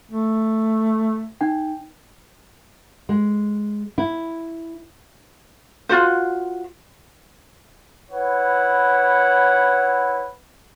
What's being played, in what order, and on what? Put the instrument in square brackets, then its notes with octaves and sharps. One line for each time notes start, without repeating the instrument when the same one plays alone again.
[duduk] A3
[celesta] D#4 G5
[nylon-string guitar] G#3
E4
[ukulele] F4 F#4 C5
[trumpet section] E4 B4 C#5 F#5